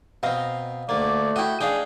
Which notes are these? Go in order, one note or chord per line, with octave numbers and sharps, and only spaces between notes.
B2 C4 D#5 F5 A#5
D2 A3 A#3 D5
E4 F#4 D#5 G5
D4 D#4 G#4 F5 G5